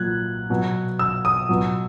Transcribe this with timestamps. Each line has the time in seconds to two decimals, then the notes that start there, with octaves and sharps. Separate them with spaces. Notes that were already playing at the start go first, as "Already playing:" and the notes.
Already playing: A#2 F#3 F#6 G#6
0.50 B2 F#3
0.99 E6
1.25 D#6
1.49 B2 F#3